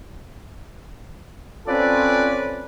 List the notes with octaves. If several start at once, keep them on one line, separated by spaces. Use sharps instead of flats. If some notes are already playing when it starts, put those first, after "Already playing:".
C4 C#4 F4 A4 B4 D5